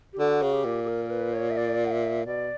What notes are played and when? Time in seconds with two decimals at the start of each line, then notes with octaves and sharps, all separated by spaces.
0.13 G4
0.19 D3 F#4
0.42 C#3
0.53 G4
0.65 A#2
0.84 G4
0.88 A#4
1.05 A#4
1.10 B4
1.33 C#5
1.50 E5
1.57 D5
1.85 F#5
1.91 E5
2.26 B2 D5